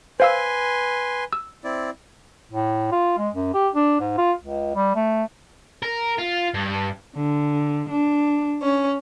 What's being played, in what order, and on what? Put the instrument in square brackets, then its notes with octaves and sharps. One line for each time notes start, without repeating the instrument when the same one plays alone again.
[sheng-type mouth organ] B4 G#5 C6 [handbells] C5 F5 E6
[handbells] E6
[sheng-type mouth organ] C4 E4 D5
[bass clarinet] A2
F4
G#3
F#2
G4
D4
G#2
F4
C#2
G3
A3
[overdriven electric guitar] A#4
F4
G2
[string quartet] D3
D4
C#4